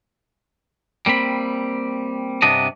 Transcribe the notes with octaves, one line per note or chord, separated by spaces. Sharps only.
G3 A#3 C4 B5
G2 C3 B3 D4 D#5